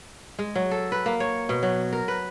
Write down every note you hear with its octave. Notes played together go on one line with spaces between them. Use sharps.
G#3
F#3
A4
B4
A#3
C#5
B2
F#3
A#4
B4